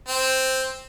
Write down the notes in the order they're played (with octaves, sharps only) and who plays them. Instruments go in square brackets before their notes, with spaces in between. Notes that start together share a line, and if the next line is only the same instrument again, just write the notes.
[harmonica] C4